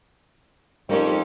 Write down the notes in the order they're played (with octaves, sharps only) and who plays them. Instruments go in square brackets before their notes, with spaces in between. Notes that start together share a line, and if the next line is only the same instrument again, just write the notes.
[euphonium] F2 [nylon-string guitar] G3 A#4 C#5 [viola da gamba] C#4 D#4 G4